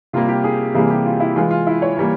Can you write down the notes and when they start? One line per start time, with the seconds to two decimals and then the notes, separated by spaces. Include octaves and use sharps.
0.13 C3 G3 A#3 F4
0.29 G4
0.44 G#4
0.74 C3 E3 G3 A#3 G#4
0.90 G4
1.06 F4
1.20 E4
1.36 E3 G#3 F4
1.51 F4
1.67 E4
1.82 C#5
1.97 E3 G3 A#3